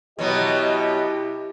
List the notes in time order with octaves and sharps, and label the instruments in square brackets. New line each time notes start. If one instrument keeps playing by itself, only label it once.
[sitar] B2 F#3 B3 [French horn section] E4 G4 [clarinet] D#5